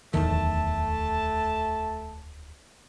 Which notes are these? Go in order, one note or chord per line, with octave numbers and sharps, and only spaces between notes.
D1 E2 D#3 A3 A5